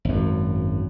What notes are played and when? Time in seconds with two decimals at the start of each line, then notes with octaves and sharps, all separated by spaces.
0.05 G#1 F#2